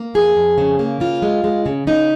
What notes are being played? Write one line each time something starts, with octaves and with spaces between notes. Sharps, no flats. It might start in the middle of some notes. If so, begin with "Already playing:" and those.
Already playing: A#3
F2 G#4
F2
C#3
A#3
C#3 F4
G#3
G#3
C#3
C#3 D#4